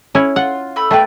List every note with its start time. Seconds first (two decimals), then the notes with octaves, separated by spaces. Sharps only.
0.15 C#4 E4
0.36 F4 F#5
0.76 A3 B5 E6
0.91 A3 A#3 G4 B4 D5